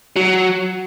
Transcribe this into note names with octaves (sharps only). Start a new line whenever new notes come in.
F#3